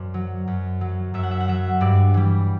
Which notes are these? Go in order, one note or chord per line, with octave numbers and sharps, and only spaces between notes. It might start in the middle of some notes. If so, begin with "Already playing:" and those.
Already playing: F#2 C5 D5
F#3
F#2
F#3
F#2 E5
F#5
E5
F#5
F#3 E5
G2 D5
E3 G3